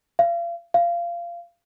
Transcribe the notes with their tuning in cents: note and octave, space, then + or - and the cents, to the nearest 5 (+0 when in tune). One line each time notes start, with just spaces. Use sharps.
F5 -35
F5 -20